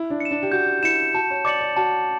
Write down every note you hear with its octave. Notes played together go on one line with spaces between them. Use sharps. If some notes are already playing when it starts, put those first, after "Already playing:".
Already playing: E4
D4
C#7 E7
D4
G4
F#4 G6
E4 C#7 E7
F#4 A5
C#5
D5 D6 A6 C#7 F#7
D5
F#4 A5